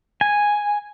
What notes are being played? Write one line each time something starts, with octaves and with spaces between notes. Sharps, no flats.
G#5